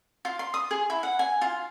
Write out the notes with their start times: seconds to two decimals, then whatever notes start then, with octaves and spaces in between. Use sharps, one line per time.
0.25 F4
0.39 C6
0.54 D#6
0.71 G#4
0.90 E4
1.03 F#5
1.19 G#5
1.41 F4